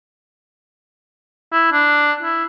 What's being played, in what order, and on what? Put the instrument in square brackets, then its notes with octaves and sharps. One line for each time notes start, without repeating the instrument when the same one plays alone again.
[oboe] E4
D4
E4